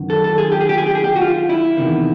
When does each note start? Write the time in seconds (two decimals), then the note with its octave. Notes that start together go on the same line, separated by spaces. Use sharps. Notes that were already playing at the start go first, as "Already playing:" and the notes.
Already playing: F#2 D#3
0.10 A4
0.24 A4
0.38 G#4
0.52 G4
0.61 G#4
0.69 G4
0.78 G#4
0.87 G4
0.95 G#4
1.04 G4
1.16 F#4
1.21 F4
1.49 E4
1.77 E2 C3 D#3